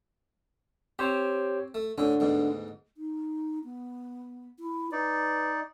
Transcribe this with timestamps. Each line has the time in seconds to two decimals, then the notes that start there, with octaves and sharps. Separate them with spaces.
0.99 C4 G4 C5 C#5
1.74 A3
1.98 A2 D3 C#4
2.20 D2 G#2 B2
2.97 D#4
3.64 B3
4.59 E4
4.92 D#4 B4 D5